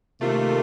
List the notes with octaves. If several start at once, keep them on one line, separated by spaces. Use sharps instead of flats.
C3 D#3 A3 A#3 F4